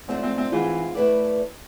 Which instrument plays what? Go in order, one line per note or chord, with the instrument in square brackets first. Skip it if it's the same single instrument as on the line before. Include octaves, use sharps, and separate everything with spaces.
[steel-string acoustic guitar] G#2 F3 A3 D4 [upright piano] C4
[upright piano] C4
C4
[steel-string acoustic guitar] G#2 G#3 C4 F4 [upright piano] E3
[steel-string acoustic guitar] A3 E4 B4 D5